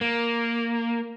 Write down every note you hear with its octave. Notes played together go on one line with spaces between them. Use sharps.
A#3